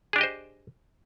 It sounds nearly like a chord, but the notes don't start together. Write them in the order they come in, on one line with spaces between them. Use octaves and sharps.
G#4 D4 G4 D#5 C5